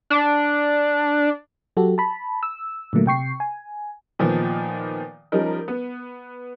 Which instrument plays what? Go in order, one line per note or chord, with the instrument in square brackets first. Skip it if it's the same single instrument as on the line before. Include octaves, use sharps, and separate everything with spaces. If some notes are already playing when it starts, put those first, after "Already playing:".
[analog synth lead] D4
[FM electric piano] F#3 F#4 G4 A4
A5 B5
E6
A#2 D3 F#3 A3 A#3
C3 G5 C#6 C7
G#5
[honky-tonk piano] A#2 D#3 F3 B3
F3 G3 C#4 D#4 A#4
B3